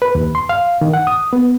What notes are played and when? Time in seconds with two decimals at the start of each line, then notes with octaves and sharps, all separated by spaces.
0.02 B4
0.15 D#2
0.35 C6
0.49 F5
0.81 D#3
0.94 F#5
1.07 D#6
1.33 B3